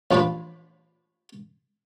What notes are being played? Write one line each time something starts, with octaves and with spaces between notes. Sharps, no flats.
A1 F3 D4 B4 B5